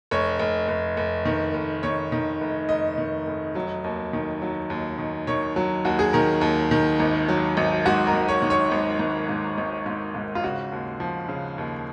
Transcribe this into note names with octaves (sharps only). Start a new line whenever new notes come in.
F1 C#5
F1
F1
F1
D#3
F1
D#3 C#5
D#3
F1
F1 D#5
D#3
F1
F#3
D#2
D#3
F#3
D#2
D#3
D#3 C#5
F#3
D#2 F#4
G#4
D#3 A#4
D#2
D#3
G#1
F#3
G#1
G#2 F#4
A#4
G#1
C#5
D#3
C#5
G#1
G#1
G#2
G#1
G#2
G#2
F4
C#3 F#4
D#2
F3
C#3
D#2